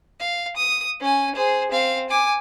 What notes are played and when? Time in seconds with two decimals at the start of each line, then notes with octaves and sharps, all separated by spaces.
0.20 F5
0.56 D#6
1.00 C#4 G#5
1.35 G#4 C5
1.71 C4 F5
2.10 G#5 D6